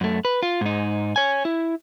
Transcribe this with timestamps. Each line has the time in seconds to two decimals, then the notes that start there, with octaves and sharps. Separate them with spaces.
0.01 F#2 A3
0.25 B4
0.43 F4
0.61 G#2 D#4
1.16 C#5 G#5
1.45 E4